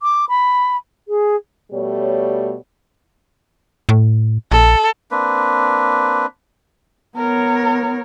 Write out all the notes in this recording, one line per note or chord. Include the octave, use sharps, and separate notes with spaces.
D6
B5
G#4
B2 G3 A3 C#5
A2
A#1 A4
A#3 C4 D4 B4
B3 A#4 C#5